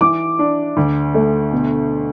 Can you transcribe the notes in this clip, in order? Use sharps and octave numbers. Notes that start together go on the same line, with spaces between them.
E3 D6
D4
D2
A3
B2